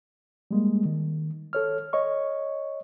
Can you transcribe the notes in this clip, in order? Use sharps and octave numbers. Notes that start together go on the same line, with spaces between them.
G3 G#3 A#3
D#3
A4 C#5 F6
C#5 D#5 C#6